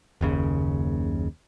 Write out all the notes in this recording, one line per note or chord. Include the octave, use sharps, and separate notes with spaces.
F#1 D#2 C#3